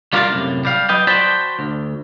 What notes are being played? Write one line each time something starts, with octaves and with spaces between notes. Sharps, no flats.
G3 F4 A#4 D5 E5 F5
C2 F#2 A2 C3
G3 F5
F#3 B4 D#5 G5
F#4 C5 D5 G5 A5 B5
D2